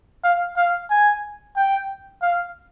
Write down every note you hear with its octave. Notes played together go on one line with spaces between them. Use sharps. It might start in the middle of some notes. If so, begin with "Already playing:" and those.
F5
F5
G#5
G5
F5